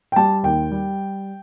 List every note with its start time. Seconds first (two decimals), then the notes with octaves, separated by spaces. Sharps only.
0.12 G5
0.16 G3 A5
0.43 D#2 G5
0.71 G3